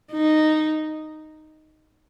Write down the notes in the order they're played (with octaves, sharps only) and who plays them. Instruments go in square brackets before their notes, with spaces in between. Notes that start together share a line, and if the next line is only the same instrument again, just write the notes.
[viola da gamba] D#4